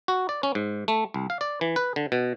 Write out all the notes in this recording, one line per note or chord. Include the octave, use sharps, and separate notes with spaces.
F#4
D5
C#4
G#2
A3
C2
F5
D5
E3
B4
D3
B2